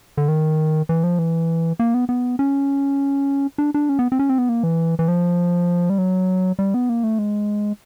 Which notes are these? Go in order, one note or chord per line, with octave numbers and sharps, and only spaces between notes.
D3
D#3
E3
F3
E3
A#3
B3
B3
C#4
D4
D4
C#4
B3
C4
C#4
C4
B3
A#3
E3
E3
F3
G3
F#3
G3
B3
A#3
A3
G#3